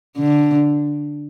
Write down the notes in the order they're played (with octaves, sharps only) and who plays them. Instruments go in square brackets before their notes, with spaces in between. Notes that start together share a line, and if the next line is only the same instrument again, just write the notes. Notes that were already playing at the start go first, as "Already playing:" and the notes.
[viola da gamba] D3